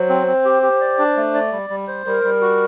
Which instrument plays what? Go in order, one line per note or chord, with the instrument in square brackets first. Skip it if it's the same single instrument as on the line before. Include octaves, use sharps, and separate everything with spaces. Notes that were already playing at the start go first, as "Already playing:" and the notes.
Already playing: [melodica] F#3 [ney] C5
[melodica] C4
C4
G4
G4
D5
D4
A3
D5
G3
G3
C5
[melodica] G3 [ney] A#4
[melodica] G3
F#4